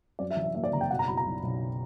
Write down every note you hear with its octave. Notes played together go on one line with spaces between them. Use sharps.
F#2 D5
E5
E3
E5
A#3 E5
D5
F#1 A#5
G5
B2 F#5
A#5
F#3 B5
A#5
B1
B1